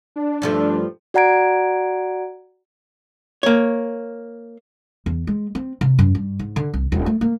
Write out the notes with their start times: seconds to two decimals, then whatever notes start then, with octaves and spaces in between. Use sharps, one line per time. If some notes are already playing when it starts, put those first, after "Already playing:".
0.16 D4
0.42 G2 F3 A3
1.14 F#4 D5 F#5 A#5 G#6 D7
3.43 A#3 C#5
5.06 E2
5.27 G#3
5.55 C4
5.81 C3
5.99 F#2
6.15 G2
6.39 G#2
6.56 D3
6.74 C2
6.92 D#1
7.06 A3
7.21 A#3